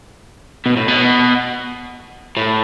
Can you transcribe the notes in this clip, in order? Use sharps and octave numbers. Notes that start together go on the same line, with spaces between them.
B2
A2
B2
A2